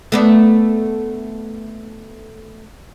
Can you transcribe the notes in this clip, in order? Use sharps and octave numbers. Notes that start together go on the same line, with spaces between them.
A3 B3 D4